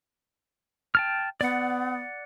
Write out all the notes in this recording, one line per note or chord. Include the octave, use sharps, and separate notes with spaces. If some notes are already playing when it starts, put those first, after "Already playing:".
G5 A5 F6
B3 D5 F#5